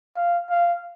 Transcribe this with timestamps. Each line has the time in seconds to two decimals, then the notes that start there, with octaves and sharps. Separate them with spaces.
0.16 F5
0.50 F5